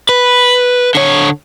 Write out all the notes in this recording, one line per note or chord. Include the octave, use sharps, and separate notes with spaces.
B4
D3 C#5